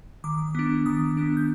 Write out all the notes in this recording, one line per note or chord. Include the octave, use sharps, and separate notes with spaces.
D#3 D6
B3 D4
D#3 D#6
B3 D4
G6